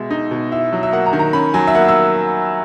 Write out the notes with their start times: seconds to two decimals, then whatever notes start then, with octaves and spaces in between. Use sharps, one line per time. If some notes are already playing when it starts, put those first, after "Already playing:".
Already playing: B2 G#3 E5
0.11 D#4
0.31 B2
0.52 E4 E5
0.73 F#3
0.83 E5
0.93 A#3 F#5
1.06 A#5
1.13 D#3
1.19 A#5
1.33 C#4 B5
1.54 F#3 G#5
1.67 E5
1.75 A#3 F#5
1.88 E6